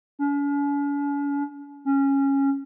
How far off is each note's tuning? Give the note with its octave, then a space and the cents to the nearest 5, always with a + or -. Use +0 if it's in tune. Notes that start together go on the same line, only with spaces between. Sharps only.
C#4 +45
C#4 -10